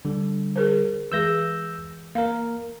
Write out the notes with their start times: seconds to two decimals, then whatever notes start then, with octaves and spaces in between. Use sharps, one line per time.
0.05 D3 G3
0.56 G#4 A#4 C5
1.12 E3 G#3 G#4 E6 G6 A#6
2.15 A#3 A#4 F5